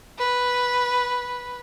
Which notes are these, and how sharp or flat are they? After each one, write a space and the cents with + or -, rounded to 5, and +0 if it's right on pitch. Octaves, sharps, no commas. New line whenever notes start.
B4 -5